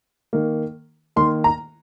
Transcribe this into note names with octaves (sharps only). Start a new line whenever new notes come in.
D#3 A#3
D#3 A#3 C6
A#5